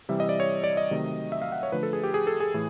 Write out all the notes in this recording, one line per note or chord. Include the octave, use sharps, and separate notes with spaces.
C3 E3 G3 E5
D#5
D5
C#5
D5
D#5
C3 D#3 F#3 A3
E5
F5
F#5
C#5
D3 F3 A3 B4
A4
G#4
G4
G#4
A4
G#4
A2 E3